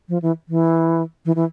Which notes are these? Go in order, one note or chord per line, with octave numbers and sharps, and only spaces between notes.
F3
E3
E3
E3
E3